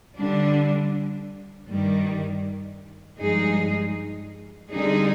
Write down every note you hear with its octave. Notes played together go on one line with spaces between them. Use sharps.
D3 G3 D4
G2 D#3 G3
G2 F3 G#3 D#4 G#4
D3 G3 C4 D#4 G#4